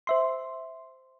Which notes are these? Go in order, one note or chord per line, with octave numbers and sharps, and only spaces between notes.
C5 E5 C6